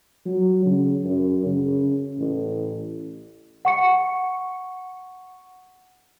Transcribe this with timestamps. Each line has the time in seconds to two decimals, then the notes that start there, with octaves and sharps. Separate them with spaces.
0.26 F#3
0.66 C#3
1.04 F#2
1.46 C#3
2.18 A1
3.65 F#5 C#6 C#7